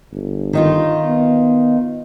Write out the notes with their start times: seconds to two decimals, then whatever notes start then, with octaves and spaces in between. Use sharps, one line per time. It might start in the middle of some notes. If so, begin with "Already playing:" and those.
0.12 G1
0.53 D#3 D#4 F4
1.05 B3